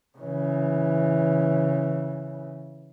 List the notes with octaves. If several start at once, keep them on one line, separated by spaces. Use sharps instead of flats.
C#3 E3